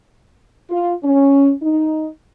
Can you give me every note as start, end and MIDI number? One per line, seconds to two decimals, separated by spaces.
0.69 0.91 65
1.03 1.51 61
1.62 2.08 63